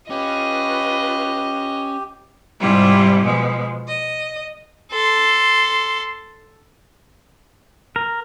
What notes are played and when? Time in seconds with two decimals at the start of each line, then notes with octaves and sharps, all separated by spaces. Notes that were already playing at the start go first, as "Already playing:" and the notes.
0.10 C#4 F4 G4 B4 D#5
2.59 G#2 C3 G3 E4 F4 G4
3.22 B2 F3 G#3
3.88 D#5
4.92 A4 C6
7.96 A#4